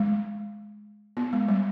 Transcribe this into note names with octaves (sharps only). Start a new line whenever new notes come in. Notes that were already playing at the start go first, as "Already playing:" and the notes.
Already playing: G#3
B3
G#3
G3